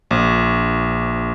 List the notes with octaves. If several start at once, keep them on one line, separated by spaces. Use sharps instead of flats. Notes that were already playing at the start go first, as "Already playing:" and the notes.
A#1